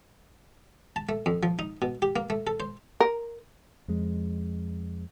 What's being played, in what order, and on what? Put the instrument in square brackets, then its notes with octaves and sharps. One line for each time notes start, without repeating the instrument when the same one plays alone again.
[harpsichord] A5
A3
F2
F3
D#4
B2
G4
A#3
A3
A4
C5
[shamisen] A#4
[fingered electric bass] F2 G#3